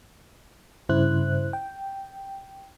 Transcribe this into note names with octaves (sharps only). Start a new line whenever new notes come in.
G2 C#3 E4 C5 F#6
G5